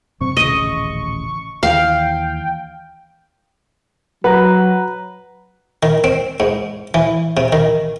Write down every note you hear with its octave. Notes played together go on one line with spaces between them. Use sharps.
F#2 C3 C4 C#6
D#1 A1 C#3 D#5
D#2 E3 F5 G5
F#3 B4 F#5 A#5
D#3
C4
G#2
E3
C3
D#3